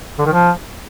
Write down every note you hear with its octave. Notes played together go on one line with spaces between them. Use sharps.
D3
D#3
F3